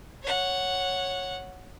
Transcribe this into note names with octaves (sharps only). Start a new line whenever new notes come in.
C#5 F#5